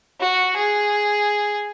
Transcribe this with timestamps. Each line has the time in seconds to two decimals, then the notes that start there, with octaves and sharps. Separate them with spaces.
0.20 F#4
0.57 G#4